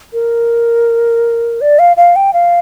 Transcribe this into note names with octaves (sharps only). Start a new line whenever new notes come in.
A#4
D5
F5
F5
G5
F5